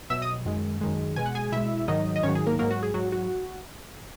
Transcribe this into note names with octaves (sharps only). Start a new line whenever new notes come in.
B2 F#3 E5 E6
D#5 D#6
F#2 D#3 G#3
F#2 D#3 G#3
B2 G#3 G#5
F#5
G#4 G#5
B2 G#3 E4 E5
G#2 D#3 F#3 D#4 D#5
D#5
G#2 D#3 F#3 C#4 C#5
G#4
A#3 A#4
G#2 F#3 A#3 A#4
F#4
G#4
G#2 F#3 F#4
F#4